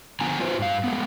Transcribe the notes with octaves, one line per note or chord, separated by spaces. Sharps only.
D3 F3 B3 G#5 A#5
F4 B4 C5
G2 F5
G#3 A3 B3